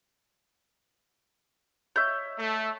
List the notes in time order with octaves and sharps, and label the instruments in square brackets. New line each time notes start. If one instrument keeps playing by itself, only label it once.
[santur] C#5 E5 [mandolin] G6
[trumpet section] A3